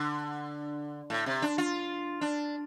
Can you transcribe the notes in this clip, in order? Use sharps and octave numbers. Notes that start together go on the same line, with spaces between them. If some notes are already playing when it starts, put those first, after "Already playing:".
Already playing: D3
A2
C3
D4
F4
D4